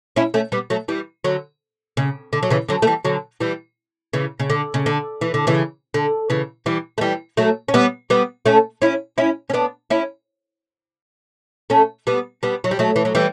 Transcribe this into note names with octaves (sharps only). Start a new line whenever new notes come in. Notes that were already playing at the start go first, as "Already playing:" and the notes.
C#4 E4
A3 C#4
G3 B3
F#3 A3
E3 G3
D3 F#3
C#3
D3
F#3
C#3 E3
D3 F#3
A3
E3 G3
D3 F#3
E3 G3
C#3 E3
C#3
D3
C#3
D3
E3
D3
C#3 E3
D3
C#3 E3
E3 G3
A3
E3 G3
F#3 A3
C#4
G3 B3
G3 B3
A3 C#4
C#4 E4
C#4 E4
C#4
B3 D4
C#4 E4
A3 C#4
G3 B3
G3 B3
F#3
G3
F#3 A3
E3
F#3
E3 G3